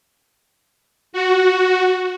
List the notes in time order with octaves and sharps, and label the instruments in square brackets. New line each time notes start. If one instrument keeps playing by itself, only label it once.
[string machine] F#4